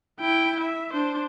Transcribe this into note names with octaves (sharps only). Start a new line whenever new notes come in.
E4 G5
E5
D4 C5